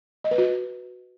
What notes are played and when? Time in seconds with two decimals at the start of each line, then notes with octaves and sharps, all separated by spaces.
0.24 D#5
0.31 B4
0.38 F#4